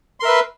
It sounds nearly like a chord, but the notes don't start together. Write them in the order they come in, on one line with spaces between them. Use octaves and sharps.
C6 A#4 E5 B4